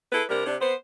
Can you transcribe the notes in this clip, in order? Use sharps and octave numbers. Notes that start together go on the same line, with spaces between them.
E4 G#4 A4 B4
C3 G3 D4 A#4
C3 D4
B3 C5